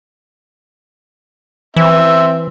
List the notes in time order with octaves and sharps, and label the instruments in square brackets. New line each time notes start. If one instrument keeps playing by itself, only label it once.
[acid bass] E3 [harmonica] C4 E5